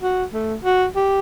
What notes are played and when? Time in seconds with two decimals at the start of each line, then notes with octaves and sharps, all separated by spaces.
0.03 F#4
0.33 A3
0.64 F#4
0.96 G4